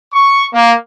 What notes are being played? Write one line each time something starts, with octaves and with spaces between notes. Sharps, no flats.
C#6
A#3